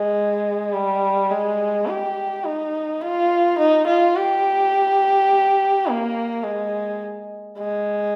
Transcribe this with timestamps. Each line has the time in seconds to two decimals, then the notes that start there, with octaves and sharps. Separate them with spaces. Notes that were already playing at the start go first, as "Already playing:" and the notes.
Already playing: G#3
0.73 G3
1.30 G#3
1.87 G4
2.44 D#4
3.02 F4
3.59 D#4
3.87 F4
4.16 G4
5.87 A#3
6.44 G#3
7.59 G#3